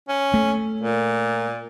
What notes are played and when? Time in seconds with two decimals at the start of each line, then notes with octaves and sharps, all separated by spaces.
0.09 C#4
0.34 A3
0.81 A#2